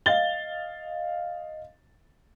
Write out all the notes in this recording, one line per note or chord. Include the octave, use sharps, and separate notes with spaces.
D#5 F5 A6 G7